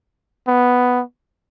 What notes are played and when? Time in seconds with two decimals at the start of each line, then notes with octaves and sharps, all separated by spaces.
0.47 B3